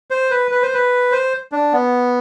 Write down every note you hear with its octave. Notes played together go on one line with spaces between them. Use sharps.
C5
B4
B4
C5
B4
C5
D4
B3